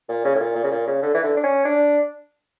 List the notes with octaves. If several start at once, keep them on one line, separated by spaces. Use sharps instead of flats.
A#2
C#3
A2
A#2
A#2
C#3
A#2
C#3
D3
E3
D3
D4
C#4
D4